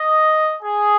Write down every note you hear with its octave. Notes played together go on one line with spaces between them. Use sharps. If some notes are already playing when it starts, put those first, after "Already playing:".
Already playing: D#5
G#4